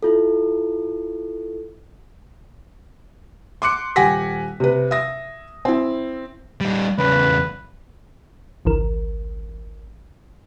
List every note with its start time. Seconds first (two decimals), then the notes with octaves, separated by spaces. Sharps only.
0.03 E4 F4 A4
3.62 C6 D6 F#6 C#7
3.96 D#1 G4 F#5 G#5 A#6 B6
4.60 C3 B4
4.91 E5 D#6 A#6
5.65 C4 E4
6.61 G3 D#4
6.98 E2 C#3 B4
8.65 G#1 C#2 E3 A#4